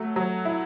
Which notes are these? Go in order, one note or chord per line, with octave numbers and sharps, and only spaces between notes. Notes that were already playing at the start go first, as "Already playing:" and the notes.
Already playing: F#3 A3
F#3
E4